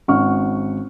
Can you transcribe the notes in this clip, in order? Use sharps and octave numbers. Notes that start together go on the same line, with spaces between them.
G#1 C#4 F#5 C#6 F6